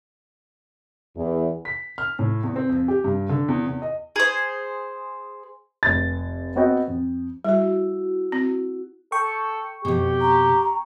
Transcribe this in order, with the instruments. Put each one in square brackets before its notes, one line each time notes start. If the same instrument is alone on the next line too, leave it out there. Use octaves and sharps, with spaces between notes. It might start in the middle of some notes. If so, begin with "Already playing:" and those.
[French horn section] E2
[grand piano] B6
F6
A2
E2
C4
F2
G4
G2
D3
E2
E2
D#5
[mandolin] G#4 C5
[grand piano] F1 C6 A6
B3 C4 F#4 D#5 G5
F2
[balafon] G3 [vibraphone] E4 F#4
[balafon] C4
[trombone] A4 [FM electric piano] G5 C#6
[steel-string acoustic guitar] F2 B2 [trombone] G4
[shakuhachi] A#5